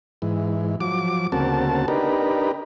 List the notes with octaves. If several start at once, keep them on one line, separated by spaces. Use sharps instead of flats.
G#2 E3
F3 F#3 D6
D2 C#3 A#3 C4 F#4 A5
D4 D#4 G4 A#4 B4